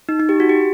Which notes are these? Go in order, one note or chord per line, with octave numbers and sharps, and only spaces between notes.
D#4
D#4
G4
F#4
G4